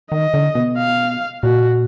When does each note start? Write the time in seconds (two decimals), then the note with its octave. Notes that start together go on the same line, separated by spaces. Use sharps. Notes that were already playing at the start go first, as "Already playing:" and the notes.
0.11 D#3 D#5
0.34 D3
0.55 B2
0.77 F5
1.43 A#2 F#4